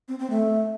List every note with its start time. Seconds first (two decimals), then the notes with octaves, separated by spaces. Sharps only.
0.08 C4
0.19 C4
0.30 A3